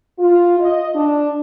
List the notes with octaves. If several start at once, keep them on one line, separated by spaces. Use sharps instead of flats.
F4
D#5
D4